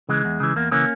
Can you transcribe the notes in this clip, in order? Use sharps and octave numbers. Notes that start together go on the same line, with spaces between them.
C#3 E3 G#3
E2
C#3 E3
E2 A#3
C#3 E3 A#3 C#4